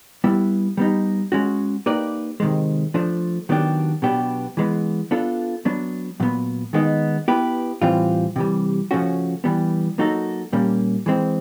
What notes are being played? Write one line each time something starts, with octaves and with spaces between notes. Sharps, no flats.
G3 B3 E4
G3 B3 D#4
G#3 C#4 F#4
A#3 D#4 G4 B4 D5
C3 D#3 G#3
F3 A3 D4
D#3 F#3 B3 D4 G4
B2 F#3 B3 D4 G4
E3 G#3 B3
B3 D4 F4 A4
F#3 B3 D4
A#2 F#3 B3
D#3 G#3 B3 D#4
B3 E4 G4 B4
A2 E3 G3 C4 F4
C3 E3 G3
C#3 F3 A3 C#4 F#4
E3 G3 B3
F#3 A#3 D#4 F#4 A4
A#2 G3 A#3 C#4
E3 G#3 C4